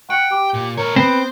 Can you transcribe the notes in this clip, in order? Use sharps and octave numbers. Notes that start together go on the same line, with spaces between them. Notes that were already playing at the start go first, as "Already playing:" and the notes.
F#5 G5
G4
A#2
A#2 A#4 C#5
B3 C4 C5